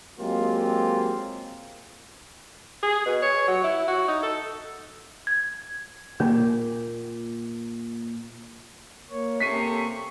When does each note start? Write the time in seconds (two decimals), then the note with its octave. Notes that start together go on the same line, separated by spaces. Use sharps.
0.20 F#3 G#3 A#3 C4 F4 G4
2.83 G#4
3.06 B2
3.22 C#5
3.48 F#3
3.64 E4
3.88 F#4
4.08 D#4
4.23 A4
5.27 G#6
6.20 A#2 A#3
9.11 A#3 C#5
9.40 C3 A#3 C#4 A4 C#6 B6 C7 D#7